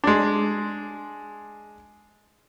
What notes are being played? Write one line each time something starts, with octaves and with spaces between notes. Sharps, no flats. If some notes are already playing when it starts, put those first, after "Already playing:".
G#3 D4